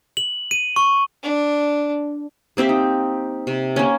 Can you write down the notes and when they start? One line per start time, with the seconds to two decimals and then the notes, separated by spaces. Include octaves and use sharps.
0.17 F#7
0.51 D#7
0.76 C#6
1.23 D4
2.57 A#3 C4 G4 E5
2.69 D#4
3.47 C3
3.76 A#3 C#4